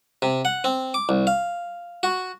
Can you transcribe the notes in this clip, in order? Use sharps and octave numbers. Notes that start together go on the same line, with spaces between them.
C3
F#5
C4
D6
C2
F5
F#4